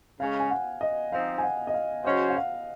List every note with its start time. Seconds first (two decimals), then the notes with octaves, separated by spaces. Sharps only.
0.20 C#3 G#3 C#4 F5
0.40 G#5
0.51 F#5
0.81 D#5
1.12 F3 C4 D#4 F5
1.38 G#5
1.43 F#5
1.67 D#5
1.74 F5
2.05 C#3 F#3 C#4 F#4 C5 D#5
2.30 F#5
2.36 F5